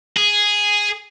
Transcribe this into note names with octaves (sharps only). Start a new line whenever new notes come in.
G#4